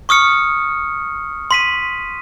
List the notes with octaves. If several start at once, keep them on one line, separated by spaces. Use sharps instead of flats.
C#6 D#6 F6 C#7
C6 B6 D#7